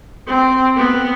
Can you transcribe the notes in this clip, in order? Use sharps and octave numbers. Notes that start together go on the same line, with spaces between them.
C4
B3